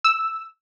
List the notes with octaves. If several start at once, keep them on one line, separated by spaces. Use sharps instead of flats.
E6